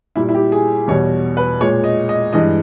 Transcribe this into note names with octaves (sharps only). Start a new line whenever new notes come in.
A#2 G3 E4
E4
G4
G#4
E2 B2 G3 C#5
B4
A#2 G#3 C#5
D#5
D#5
G2 E3 G#3 D#5